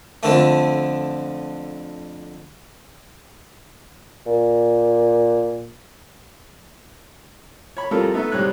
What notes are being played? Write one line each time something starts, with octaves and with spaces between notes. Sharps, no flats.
F2 D3 A3
A#2
C#5 B5
F2 A2 G3 F4 A4 A#4
A3 B3 D#4 A4 E5
C2 G#2 G3 C#5 F#6